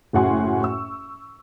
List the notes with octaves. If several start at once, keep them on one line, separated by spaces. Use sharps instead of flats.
F#1 A2 F#4 F#5 G#5 C6
C#6 E6